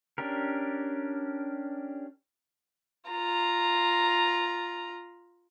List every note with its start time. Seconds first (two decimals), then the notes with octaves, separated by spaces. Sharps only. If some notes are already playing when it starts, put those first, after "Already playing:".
0.18 C#4 D4 G4 A#4
3.10 F4 A#5